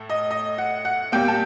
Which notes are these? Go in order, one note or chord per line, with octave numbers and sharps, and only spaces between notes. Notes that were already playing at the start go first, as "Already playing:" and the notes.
Already playing: A2 A3
D#5
D#5
F#5
F#5
A#2 G3 A#3 G5
A5